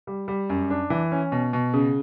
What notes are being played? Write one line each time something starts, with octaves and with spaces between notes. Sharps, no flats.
G3
G3
F#2
D4
E3
C#4
B2
B2
C#3